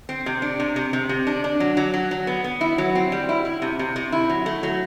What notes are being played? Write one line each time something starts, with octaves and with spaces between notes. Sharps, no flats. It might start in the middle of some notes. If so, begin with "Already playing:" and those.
C4
C3
D4
C3
C3
C3
C3
D4
D4
F#3
F#3
F#3
F#3
B3
B3
E4
F#3
C4
G3
E4
E4
C3
C3
C3
E4
F#3
A3
F#3